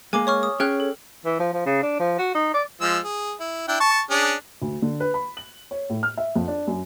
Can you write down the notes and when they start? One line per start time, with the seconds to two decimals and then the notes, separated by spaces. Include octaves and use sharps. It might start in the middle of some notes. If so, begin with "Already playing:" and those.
0.13 G#3 A#3 G#5 D6
0.27 C#5 C#6 F6
0.43 D#6
0.60 C#4 G#4 C#5 G5 F6 F#6
0.80 A4
1.25 E3
1.40 F3
1.53 F3
1.66 C#3
1.83 D4
1.99 F3
2.19 F#4
2.34 D#4
2.54 D5
2.81 F3 G#3 E6
3.04 G#4
3.40 E4
3.68 D4 E4 G5
3.80 A5 C#6
4.10 C#4 D4 G#4
4.62 D2
4.82 D3
5.00 B4
5.14 B5
5.37 F#7
5.71 C#5
5.90 A2
6.03 F6
6.18 E5
6.36 F2
6.48 D4
6.67 F#2